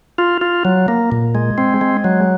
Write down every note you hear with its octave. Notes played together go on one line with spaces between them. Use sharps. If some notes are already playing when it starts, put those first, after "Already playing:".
F4
F4
F#3
A#3
A#2
G#3
C4
G#3
F#3